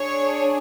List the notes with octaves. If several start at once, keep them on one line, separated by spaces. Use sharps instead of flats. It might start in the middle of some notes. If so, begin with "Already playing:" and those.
Already playing: D4 G#4 C#5